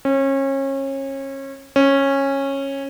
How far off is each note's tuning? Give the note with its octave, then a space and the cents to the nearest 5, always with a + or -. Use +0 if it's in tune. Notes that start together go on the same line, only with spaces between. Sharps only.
C#4 -30
C#4 -15